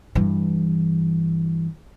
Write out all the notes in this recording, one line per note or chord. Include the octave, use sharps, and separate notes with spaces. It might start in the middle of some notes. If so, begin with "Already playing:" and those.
G2 E3